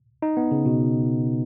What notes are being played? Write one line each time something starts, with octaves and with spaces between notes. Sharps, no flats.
D#4
B3
C#3
B2